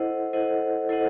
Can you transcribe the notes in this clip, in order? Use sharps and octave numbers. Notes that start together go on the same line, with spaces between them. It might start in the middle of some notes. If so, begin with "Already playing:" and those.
Already playing: E4 A4 C5 D#5 F#5
E4 A4 C5 D#5 F#5
E4 A4 C5 D#5 F#5